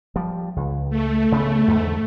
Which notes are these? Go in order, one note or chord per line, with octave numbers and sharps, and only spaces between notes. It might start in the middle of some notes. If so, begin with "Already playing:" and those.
F3 G3
C#2
A3
C#3 A#3 B3
E2 G#2 D3